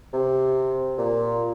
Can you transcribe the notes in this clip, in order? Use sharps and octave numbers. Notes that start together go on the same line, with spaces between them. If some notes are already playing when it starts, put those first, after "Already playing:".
C3
A#2